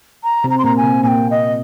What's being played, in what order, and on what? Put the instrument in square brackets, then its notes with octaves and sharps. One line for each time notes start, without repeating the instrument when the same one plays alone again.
[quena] A#5
[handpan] C3 C4
[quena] A#5
C6
[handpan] A#2 A#3 [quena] A#5
[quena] G#5
[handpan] C3 C4
[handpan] A#2 A#3 [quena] G#5
[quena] G5
D#5